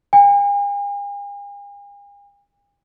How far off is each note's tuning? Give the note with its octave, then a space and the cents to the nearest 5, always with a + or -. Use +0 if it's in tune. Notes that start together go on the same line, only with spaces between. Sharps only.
G#5 -45